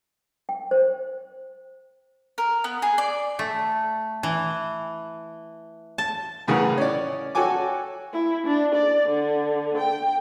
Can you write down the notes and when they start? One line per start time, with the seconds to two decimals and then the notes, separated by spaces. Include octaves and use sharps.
0.49 G5
0.71 C5
2.38 A#4
2.64 B3
2.82 G#4
2.98 D5
3.39 A3
4.23 E3
5.98 A5
6.47 A2 C#3 E3 G#4 A#4 F#5
6.78 C#4 D5
7.35 F#4 A4 C#5 G5 G#5 D6
8.13 E4
8.47 D4
8.75 D5
9.09 D3
9.78 G5